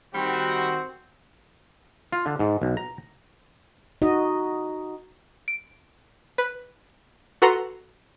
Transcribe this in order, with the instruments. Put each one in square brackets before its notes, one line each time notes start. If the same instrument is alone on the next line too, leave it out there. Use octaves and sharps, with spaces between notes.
[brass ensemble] D#3 F#4 [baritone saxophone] G3 [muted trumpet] C4
[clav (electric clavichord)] F4
D3
G#2
B1
A#5
[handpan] D#4 F#4 D#5
[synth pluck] D7
B4
F#4 A4 B4 F#5 A#5 C6